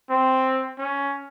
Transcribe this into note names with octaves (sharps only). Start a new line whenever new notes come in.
C4
C#4